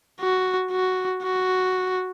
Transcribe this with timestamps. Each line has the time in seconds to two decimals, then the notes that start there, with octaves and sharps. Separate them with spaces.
0.20 F#4
0.72 F#4
1.23 F#4